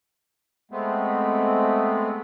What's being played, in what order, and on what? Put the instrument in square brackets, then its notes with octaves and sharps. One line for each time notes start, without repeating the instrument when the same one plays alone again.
[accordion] G#3 A3 B3 C4